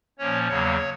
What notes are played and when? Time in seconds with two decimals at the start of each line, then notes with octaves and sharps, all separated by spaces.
0.19 A#2 F3 A#3 C#4 C#5
0.48 E2 C#3 F#3 A#3 C#5